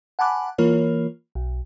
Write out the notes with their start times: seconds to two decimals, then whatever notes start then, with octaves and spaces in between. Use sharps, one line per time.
0.19 F#5 G#5 A5 B5 D6 F#6
0.58 E3 A#3 F4 A#4 C#5
1.35 B1